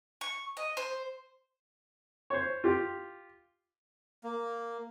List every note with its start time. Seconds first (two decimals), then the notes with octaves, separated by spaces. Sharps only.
0.21 C#6
0.57 D#5
0.77 C5
2.30 C5 C#5
2.64 F4 G4
4.23 A#3